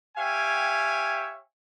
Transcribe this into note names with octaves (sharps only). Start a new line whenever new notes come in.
G4 C#5 E5 F5 G5 G#5